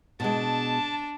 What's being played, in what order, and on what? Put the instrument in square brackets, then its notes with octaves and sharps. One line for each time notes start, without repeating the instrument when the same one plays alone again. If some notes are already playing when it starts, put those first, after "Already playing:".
[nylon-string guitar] B2 G#3 [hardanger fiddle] D4 [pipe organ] A5